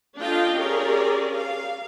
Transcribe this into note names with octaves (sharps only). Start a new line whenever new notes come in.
D4 F4 A4 D#5 F5 G5
C#4 G4 G#4 A#4 C#5 D5
F5